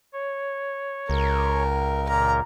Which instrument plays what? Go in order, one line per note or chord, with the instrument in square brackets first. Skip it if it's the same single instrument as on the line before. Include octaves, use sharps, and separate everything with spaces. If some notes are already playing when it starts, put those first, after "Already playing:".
[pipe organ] C#5
[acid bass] C#2 [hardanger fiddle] A#4
[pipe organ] A#2 A#4 [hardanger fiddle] A#5